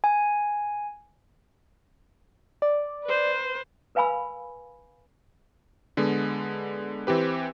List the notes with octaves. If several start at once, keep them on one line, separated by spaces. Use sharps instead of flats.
G#5
D5
B4 C5
A#4 B4 F5 G#5 B5 E6
D3 G#3 B3
E3 C4 G4 B4